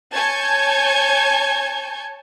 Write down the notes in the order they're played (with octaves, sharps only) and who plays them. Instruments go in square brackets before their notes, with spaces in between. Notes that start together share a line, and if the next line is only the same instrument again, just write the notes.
[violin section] C#5 G#5 A5 G6 G#6